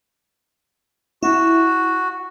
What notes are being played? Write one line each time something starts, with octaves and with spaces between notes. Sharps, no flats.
E4 F#4